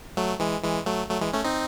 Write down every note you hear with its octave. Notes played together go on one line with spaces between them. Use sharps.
F#3 A3
E3 G#3
E3 G#3
F#3 A3
F#3 A3
E3 G#3
A3 C#4
C4 D#4